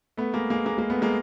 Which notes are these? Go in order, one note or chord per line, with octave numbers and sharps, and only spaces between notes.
A3 B3
G#3 A#3
G#3 A#3
G#3 A#3
G#3 A#3
A3 B3
G#3 A#3